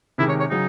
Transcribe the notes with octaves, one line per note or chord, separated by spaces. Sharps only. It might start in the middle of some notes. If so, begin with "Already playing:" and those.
C3 D#3 G#3 E4
C#5
C#5
C#3 F#3 D#4